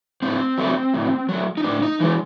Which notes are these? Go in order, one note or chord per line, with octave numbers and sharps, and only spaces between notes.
A2 C4
F#3 A3
A2
F#3 A3
D#4
A2 D4
D#4
E3 G#3